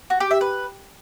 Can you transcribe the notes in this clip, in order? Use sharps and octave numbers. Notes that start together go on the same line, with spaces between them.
F#4
G4
E5
B4